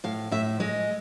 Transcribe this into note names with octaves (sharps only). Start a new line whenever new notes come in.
A2 F5
A2 E5
G#3 D#5